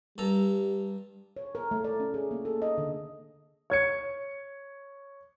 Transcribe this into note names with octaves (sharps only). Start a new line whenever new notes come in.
G2 G3 A4 A#5
C#5
A#4
A3
D5
C#4
G#4
A#3
A4
D#5
D3
C#5 G#6 C#7